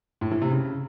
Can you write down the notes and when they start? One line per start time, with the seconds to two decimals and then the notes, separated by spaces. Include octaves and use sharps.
0.21 A2
0.32 E3
0.42 C3
0.52 C#3